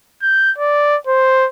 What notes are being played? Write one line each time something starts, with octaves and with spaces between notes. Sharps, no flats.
G6
D5
C5